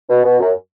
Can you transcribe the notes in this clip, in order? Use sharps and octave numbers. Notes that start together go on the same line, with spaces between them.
B2
B2
F#2